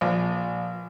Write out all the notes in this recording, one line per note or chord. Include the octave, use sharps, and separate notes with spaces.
A#1